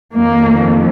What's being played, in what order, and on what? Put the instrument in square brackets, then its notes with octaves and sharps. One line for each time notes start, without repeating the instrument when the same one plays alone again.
[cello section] F2 D#3 A#3